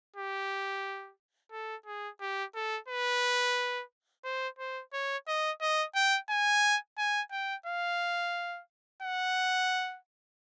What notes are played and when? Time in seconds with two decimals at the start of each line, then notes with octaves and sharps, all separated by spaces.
0.16 G4
1.52 A4
1.86 G#4
2.21 G4
2.55 A4
2.88 B4
4.24 C5
4.59 C5
4.93 C#5
5.27 D#5
5.61 D#5
5.95 G5
6.30 G#5
6.98 G#5
7.31 G5
7.66 F5
9.02 F#5